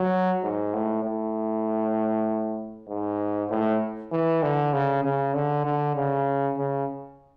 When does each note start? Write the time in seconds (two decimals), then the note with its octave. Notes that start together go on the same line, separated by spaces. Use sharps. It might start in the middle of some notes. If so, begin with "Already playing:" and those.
Already playing: F#3
0.43 G#2
0.74 A2
1.04 A2
2.89 G#2
3.50 A2
4.12 E3
4.43 D3
4.73 C#3
5.04 C#3
5.34 D3
5.65 D3
5.96 C#3
6.58 C#3